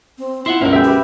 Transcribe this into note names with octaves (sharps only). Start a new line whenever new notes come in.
C4
E4 F4 E5 F#5 C6
G1 C#2 C#4 A#4 E5
F#3 G#3 B3 E5 G5
G4 B4 B5